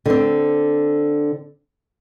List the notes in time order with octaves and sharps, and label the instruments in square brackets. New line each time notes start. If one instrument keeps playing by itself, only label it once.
[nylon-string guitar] D3 C4